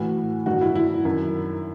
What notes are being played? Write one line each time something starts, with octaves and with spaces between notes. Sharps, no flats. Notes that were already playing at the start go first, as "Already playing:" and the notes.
Already playing: A2 E3 F#4
G2 D#3 F#4
E4
E4
F#2 D#3